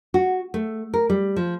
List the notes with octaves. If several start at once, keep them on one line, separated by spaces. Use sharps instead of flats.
F#4
A3
A#4
G3
F3